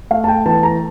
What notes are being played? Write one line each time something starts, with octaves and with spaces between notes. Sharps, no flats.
A3 F5
A5
G5
E3 A5
A#5